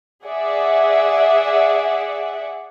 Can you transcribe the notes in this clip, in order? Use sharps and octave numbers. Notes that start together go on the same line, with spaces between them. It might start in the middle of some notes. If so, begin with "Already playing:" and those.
G#4 D5 E5 F#5